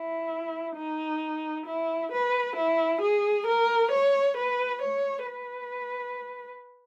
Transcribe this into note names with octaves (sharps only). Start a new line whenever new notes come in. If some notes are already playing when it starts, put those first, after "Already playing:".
Already playing: E4
D#4
E4
B4
E4
G#4
A#4
C#5
B4
C#5
B4